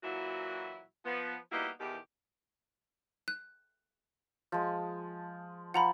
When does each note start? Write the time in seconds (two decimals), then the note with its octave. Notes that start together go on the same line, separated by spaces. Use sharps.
0.03 A#2 E3 F#3 E4 F#4
1.06 F3 B3
1.52 G3 A#3 B3 D#4 E4 F#4
1.80 E2 B2 D#3 E3 G4
3.28 F#6
4.52 F3 G#3
5.74 F3 F#5 A#5 B5